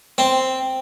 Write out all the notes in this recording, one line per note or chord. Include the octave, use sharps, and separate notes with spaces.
C4